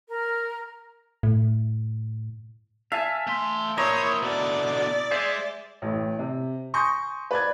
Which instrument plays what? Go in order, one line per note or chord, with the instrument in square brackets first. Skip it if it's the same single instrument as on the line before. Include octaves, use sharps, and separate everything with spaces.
[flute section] A#4
[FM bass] A2
[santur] E5 A5 [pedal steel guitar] F5 G#5
[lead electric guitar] A3 C6
[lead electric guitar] A#3 C5 [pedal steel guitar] E4 A#5 [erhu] C#5 [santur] D#5
[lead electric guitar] B2 D3 [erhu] D5
[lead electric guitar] G#3 G#4 [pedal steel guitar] C5 E5
[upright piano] A1 A2
C3
G#5 C6 C#6 D#6 G6 A#6
B4 D5 G#6